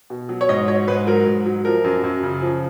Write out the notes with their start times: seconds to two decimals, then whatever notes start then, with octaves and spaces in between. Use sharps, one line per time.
0.10 B2
0.29 F#3
0.41 C#5
0.49 G#2 D#5
0.68 F#3 C#5
0.87 G#2 B4
1.07 F#3 A#4
1.26 G#2
1.46 F#3
1.65 F3 A#4
1.84 F#2
2.03 F#2
2.23 C#3
2.42 F3